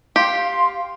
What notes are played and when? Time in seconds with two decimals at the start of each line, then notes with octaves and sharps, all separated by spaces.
0.16 G4 F5 C6